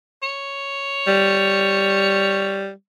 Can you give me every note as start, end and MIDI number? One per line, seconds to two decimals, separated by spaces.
0.23 2.70 73
1.07 2.71 55